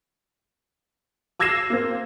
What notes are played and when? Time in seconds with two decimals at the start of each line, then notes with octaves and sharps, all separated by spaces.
1.40 D6 E6 G#6 A#6 C7 E7
1.70 A#3 C4